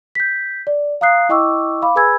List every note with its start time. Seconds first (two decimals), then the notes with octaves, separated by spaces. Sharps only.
0.15 G6 B6
0.67 D5
1.01 F5 A#5 D#6 F#6 C7
1.29 E4 D#5 G5 C#6 D6 E6
1.82 F5 B5 D6
1.95 G#4 B4 G#5 B5 E6 G#6